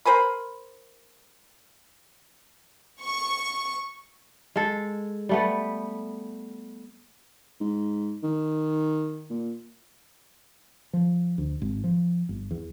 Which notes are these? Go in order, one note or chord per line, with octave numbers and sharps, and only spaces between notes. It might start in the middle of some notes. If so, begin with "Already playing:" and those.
A#4 C5 G#5 B5
C#6
G#3 A4
G3 A3 B3
G#2
D#3
A#2
F3
D2
G#1
F3
G1
E2